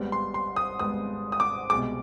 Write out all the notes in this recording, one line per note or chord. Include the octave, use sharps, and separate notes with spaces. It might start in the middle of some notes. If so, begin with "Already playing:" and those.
Already playing: G#1 G#2 G3 B3
C6
C6
D#6
G#1 G#2 G3 B3 D#6
D#6
D6
C2 B2 G#3 D6